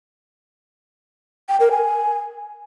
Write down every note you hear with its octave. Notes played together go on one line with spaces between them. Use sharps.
G5
A#4
G#5